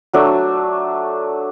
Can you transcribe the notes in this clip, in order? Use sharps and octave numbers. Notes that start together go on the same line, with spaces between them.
F#3 A3 D4